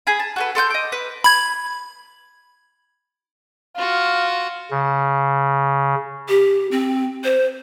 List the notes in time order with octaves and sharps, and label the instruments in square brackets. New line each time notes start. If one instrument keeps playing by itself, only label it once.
[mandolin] G#4 G#5 B5
A5
F#4 A4 B4
A4 C6 C#6 G6
D#5 D6
B4
[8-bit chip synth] B5 G#6
[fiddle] F4 F#4 [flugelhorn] F5
[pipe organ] C#3
[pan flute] G4
C4
C5